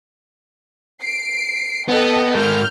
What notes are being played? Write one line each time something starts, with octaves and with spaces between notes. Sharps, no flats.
C7 D7
B3 A4 D#5 G5
G#2 A#4 F6 G6